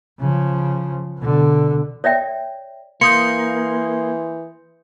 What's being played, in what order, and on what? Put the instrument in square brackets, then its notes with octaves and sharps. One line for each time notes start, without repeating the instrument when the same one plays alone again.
[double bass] C#3 F3
B2 D3
[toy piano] C#5 D5 E5 G5
[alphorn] E3 [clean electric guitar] A#3 [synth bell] C6 D#6 G6 [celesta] C#7